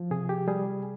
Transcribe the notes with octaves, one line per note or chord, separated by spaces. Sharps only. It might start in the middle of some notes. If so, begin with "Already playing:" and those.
Already playing: F3
C3 G#4
G4
G3 G#4